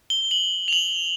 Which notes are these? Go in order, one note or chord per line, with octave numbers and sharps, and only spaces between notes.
G7
F#7
F7
F#7